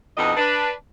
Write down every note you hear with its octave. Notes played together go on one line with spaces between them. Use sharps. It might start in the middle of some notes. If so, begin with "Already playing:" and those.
F2 B2 D4 D#4 B4 D#5
D4 B4